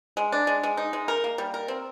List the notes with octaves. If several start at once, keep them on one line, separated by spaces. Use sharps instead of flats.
G#3
D4
G#3
G#3
D#4
G#3
A#4
A#3
G3
A#4
C4